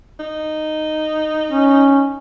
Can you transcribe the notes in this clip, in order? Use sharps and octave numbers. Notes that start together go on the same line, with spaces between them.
D#4
C#4